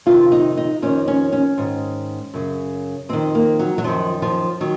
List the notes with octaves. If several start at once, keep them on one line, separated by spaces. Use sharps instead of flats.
F2 C3 D#3 F4
D#4
D#4
F2 D#3 C#4
C#4
C#4
G#2 D#3
F#2 C#3
F2 D#3 C4
A#3
F#3
F#3
F#2 D#3 F3
F3
D#3 F#3